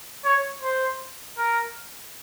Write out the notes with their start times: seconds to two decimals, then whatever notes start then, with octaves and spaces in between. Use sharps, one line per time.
0.25 C#5
0.62 C5
1.38 A#4